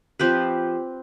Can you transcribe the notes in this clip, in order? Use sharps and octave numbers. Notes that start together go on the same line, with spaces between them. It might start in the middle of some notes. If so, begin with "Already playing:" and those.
F3 C4 G4 B4